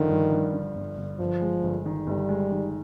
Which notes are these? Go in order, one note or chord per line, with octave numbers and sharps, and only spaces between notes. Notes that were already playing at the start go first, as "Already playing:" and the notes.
Already playing: G1 D3 D#3 F3
G2
G2
D3
G1
G1
G1 F3
G#3
G1
D#3
G1 G3
G#3
D#3